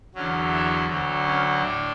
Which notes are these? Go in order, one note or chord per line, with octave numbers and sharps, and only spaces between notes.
E2 D3 F#3 C#4
E4
D2 D3 F#3
C#4
A2 D4